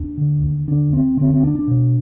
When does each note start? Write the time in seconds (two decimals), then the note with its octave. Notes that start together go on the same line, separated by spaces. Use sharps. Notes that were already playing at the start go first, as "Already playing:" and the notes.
Already playing: D#2 D4
0.17 D3
0.42 D#2
0.67 D3 D4
0.93 D#2 C4
1.17 D3 C4
1.30 C4
1.42 D#2 D4
1.55 D4
1.67 B2